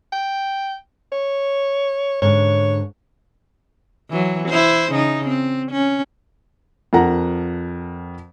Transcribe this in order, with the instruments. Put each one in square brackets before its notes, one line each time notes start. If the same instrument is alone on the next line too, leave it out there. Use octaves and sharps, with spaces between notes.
[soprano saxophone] G5
C#5
[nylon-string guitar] G#2 D3 C#4 [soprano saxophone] C#5
[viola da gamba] E3 F#3
E4 C5
C#3 D#4
C4
C#4
[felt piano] F2 F3 A#4 F#5 A#5